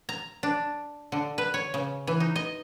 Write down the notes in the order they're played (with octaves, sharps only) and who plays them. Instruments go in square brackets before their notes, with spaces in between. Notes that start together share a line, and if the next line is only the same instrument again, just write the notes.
[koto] A#5
D4
D3
B4
C#5
C#3
E3
D#4
D#5